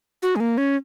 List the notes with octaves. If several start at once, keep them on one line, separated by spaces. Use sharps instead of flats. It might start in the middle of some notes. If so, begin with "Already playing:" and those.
F#4
G#3
A#3
C#4